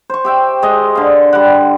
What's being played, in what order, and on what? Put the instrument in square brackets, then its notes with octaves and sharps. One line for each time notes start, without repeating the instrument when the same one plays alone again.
[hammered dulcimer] C5 C#6
G4 E5 G5
G#3 D#5
D3 F5
G3 F#5